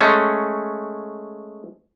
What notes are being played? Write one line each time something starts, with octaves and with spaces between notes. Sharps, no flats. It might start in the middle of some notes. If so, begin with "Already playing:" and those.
G#3 A3 C#4